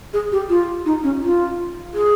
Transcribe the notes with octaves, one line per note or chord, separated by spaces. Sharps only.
G#4
G4
F4
D#4
C#4
F4
G#4